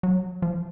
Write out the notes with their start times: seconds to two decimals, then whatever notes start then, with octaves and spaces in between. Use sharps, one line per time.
0.03 F#3
0.42 F3